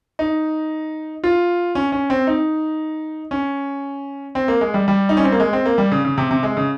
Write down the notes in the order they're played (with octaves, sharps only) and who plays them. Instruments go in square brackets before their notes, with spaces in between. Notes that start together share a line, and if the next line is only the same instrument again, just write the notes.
[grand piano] D#4
F4
C#4
C#4
C4
D#4
C#4
C4
A#3
G#3
G3
G3
D#4
C#4
C4
A#3
G#3
C4
A#3
G3
C#3
C#3
C3
C3
G#3
C#3